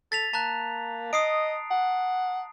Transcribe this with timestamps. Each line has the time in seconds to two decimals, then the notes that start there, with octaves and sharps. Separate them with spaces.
0.12 A4 A6 B6 F7
0.33 A#3 A5 A#5 F#6
1.13 D#5 D#6 C7 D7
1.71 F#5